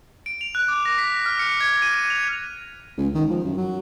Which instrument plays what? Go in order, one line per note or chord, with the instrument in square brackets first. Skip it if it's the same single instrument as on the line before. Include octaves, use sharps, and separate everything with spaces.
[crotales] D7
F7
F#6
D6
A#6
B6
F6
C#7
G#6
D#7
D#7
F7
[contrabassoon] C#2
D#3
F3
F#2
F#3